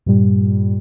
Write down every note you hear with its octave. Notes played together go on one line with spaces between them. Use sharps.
G2 A#2 G3